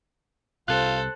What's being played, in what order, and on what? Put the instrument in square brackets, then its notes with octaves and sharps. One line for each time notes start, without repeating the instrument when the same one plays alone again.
[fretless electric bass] C2 C3 [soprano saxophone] F4 [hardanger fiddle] A4 C5 [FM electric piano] F#6